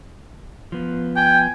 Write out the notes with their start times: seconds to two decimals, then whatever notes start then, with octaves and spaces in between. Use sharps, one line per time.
0.72 F3 B3
1.16 G5 G#5